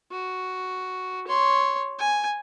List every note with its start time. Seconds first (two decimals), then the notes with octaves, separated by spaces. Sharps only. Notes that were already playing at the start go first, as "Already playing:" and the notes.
0.12 F#4
1.27 C#5 C6
1.99 G#5